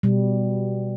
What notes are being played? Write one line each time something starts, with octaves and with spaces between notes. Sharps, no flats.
B2 G3